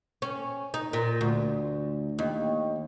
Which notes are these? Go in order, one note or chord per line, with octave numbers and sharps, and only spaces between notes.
C#4
D#4
A#2
D2
D#2